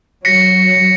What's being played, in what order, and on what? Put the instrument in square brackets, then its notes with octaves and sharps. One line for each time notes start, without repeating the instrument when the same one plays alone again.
[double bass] F#3 [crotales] A#6 B6 C#7